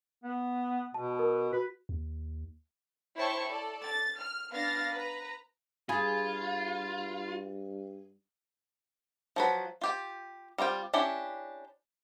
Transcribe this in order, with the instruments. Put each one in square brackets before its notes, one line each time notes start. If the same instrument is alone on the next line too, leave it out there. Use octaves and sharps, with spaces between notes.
[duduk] B3
[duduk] B2 [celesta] A5
[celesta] A#4
[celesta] F#4 [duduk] B4
[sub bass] D#2
[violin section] E4 C5 C#5 G5 A5 C#6
A4 D5
A6
F6
B3 D4 F5 F6 A6 A#6
B4 A#5
[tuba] G2 [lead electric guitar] F4 [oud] G#4 [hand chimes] F5 B5 G#6
[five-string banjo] F3 F#3 B4
F4 G4 G5
G3 C4 F4 G5
C#4 D4 E4 G4 G5